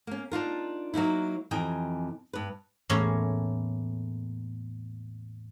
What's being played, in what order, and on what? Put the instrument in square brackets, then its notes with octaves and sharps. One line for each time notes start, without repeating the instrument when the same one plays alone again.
[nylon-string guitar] A#3 C#4
D4 D#4 F4 A#4
F#3 A#3 D#4 E4
F2 C3 E3 D#5 G5 G#5
G2 B4
[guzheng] E2 A2 A#3 C#4 C#5 A#5